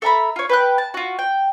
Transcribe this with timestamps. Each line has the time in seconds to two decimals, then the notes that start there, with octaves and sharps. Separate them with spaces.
0.02 A4 E5 A#5 B5
0.36 F4 C#5
0.49 B4 G5 F#6
0.78 A5
0.94 F4 F#4
1.19 G5